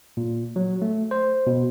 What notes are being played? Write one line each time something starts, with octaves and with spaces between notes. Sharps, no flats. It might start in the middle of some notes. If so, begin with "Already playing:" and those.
A#2
F#3
A3
C5
B2